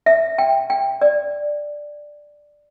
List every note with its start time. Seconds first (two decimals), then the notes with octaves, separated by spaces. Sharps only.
0.06 E5
0.38 G5
0.70 G5
1.01 D5